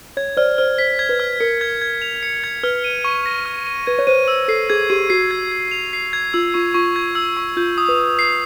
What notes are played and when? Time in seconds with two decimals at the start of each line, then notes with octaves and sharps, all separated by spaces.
0.17 C#5 G#6
0.37 C5 D5 F6
0.58 C5 F6
0.78 C5 B6
0.99 G#6
1.09 B4
1.20 F6
1.40 A#4 C#7
1.61 G#6
1.82 G#6
2.02 F7
2.23 C#7
2.44 G#6
2.63 B4 F6
2.84 D#7
3.04 C#6
3.26 A#6
3.46 F6
3.67 D#7
3.87 B4 G#6
3.99 C#5
4.07 C5 D#7
4.28 E6
4.48 A4 C7
4.70 G#4 G#6
4.90 G4 D#7
5.10 F#4 C7
5.31 G#6
5.52 G#6
5.71 F7
5.93 C7
6.13 G#6
6.34 F4 E6
6.54 F4 C#6
6.74 F4 C#6
6.96 G#6
7.15 E6
7.37 C#6
7.57 F4 G6
7.78 D#6
7.89 B4
7.98 D#6
8.19 C7